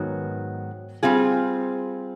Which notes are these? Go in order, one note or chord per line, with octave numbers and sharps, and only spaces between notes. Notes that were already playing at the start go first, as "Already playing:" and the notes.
Already playing: G#2 D#3 F#3 B3
G3 C4 F4 G#4